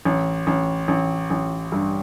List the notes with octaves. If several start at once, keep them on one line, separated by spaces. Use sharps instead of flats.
A1
A1
A1
A1
G2